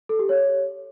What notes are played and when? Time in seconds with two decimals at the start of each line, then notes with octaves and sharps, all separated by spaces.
0.09 A4
0.19 G4
0.29 C#5